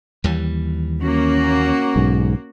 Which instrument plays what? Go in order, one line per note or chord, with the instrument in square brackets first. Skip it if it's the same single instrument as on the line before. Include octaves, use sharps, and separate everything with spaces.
[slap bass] D#2 E3 G3
[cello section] A#3 F#4 [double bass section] C#4
[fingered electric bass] B1 G#2